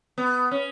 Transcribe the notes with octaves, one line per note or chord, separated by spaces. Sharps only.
B3
C#4